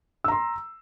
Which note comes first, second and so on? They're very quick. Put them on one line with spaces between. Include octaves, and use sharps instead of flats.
E6 A#5 C6